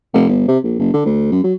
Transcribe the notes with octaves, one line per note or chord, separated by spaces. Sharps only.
F1
G1
C3
A#1
F#1
D3
D2
F#2
F#3